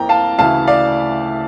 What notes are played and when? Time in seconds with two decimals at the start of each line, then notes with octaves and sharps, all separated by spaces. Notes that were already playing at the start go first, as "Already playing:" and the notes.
Already playing: F2 E3 A#3 G5 A#5
0.09 F5 A5
0.39 D2 C#3 E3 F5 A5
0.67 D5 F5